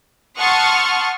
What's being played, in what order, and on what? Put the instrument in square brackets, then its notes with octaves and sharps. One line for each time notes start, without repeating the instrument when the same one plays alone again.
[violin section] F#5 A5 C6 C#6 D#6 F6